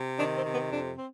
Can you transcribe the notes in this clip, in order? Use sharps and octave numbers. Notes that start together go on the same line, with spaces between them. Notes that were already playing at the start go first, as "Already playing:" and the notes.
Already playing: C3
D#3 D4
C4
C3
B3
F2 D4
C4